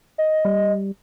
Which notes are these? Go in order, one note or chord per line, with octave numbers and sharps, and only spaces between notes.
D#5
G3